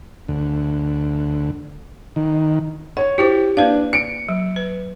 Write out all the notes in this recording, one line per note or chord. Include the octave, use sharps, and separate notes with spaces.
D2
D#3
C#5 F#5
E4 F#4 G4 C5
A#3 D4 B4 F5
C#7 D7
F#3
B4